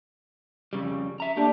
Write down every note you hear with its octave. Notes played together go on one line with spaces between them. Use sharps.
F2 C#3 G3
E5 A#5
A3 A#3 D4 G4